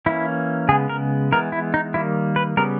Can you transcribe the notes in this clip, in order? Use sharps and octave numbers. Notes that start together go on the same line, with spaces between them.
E3 A#3 C#4 E4
C#3 G#3 B3 G#4
A#4
E3 G#3 B3 A#4
E4
D#4
D#3 G3 A#3 E4
B4
C#3 G3 B3 A#4